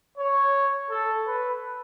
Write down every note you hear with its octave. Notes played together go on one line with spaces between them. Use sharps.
C#5
A4
B4